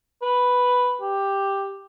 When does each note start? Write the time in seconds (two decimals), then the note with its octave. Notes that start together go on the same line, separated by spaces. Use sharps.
0.22 B4
1.02 G4